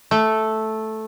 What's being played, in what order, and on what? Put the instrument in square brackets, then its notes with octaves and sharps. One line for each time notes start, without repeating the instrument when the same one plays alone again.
[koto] A3